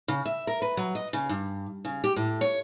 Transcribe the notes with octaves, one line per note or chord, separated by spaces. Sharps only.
C#3
E5
A#4
B4
F#3
D#5
C#3
G2
C#3
G4
A2
C#5